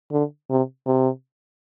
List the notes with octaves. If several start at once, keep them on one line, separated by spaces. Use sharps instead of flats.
D3
C3
C3